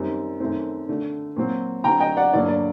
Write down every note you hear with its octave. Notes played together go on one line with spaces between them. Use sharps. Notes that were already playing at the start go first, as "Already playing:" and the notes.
Already playing: F#2 D#3 G3 C4
F#2 D#3 A3 C4
D3 A3 D4
A#2 F#3 C4
D3 F#3 C4 G5 A#5
D#5 G5
D5 F#5
G2 D3 F#3 A#3 D5
D5